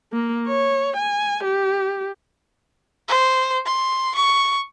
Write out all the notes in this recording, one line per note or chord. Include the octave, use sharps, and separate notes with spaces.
A#3
C#5
G#5
G4
C5
C6
C#6